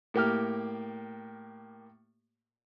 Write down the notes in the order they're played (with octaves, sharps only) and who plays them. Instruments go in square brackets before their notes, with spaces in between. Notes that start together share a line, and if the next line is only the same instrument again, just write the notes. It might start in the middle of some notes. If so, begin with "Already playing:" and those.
[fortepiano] A2 A#3 G4 F6